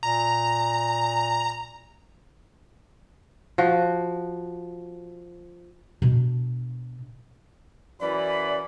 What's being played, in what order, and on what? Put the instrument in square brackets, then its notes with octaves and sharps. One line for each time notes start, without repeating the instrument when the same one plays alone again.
[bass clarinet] A#2 [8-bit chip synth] A#5
[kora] F3 F#4
[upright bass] B2 D4
[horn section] F#2 E3 B5 [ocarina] D5